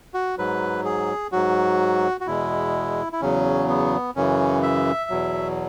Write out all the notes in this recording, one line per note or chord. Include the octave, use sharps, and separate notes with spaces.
F#4
G#2 F#3 B4
G#4
G#2 F#3 F#4
F#4
E2 B2 G#3 E4
E4
E2 C#3 F#3 C#4
B3
F#2 C#3 E3 C#4
E5
E2 B2 F#3